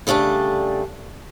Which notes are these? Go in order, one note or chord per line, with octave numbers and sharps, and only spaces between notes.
C#3 G3 A3 D4 A5